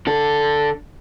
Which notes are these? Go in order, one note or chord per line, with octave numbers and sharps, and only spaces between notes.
D3 A4